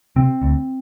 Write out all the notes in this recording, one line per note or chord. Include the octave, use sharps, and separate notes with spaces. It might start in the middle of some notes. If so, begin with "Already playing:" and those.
C3 C4
D2